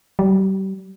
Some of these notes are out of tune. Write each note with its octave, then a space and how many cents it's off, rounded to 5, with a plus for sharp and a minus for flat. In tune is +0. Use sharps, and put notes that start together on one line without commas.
G3 -35